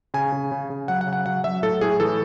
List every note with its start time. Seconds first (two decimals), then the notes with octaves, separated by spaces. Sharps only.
0.14 C#3 G#5
0.32 C#3
0.52 C#3
0.70 C#3
0.88 F#3 F#5
1.01 F#5
1.07 C#3
1.13 F#5
1.26 F#3 F#5
1.44 F#3 E5
1.63 A2 A4
1.81 A2 G#4
2.00 E3 A4